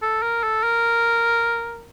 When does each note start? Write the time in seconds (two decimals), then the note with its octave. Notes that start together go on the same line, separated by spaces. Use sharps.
0.02 A4
0.22 A#4
0.43 A4
0.63 A#4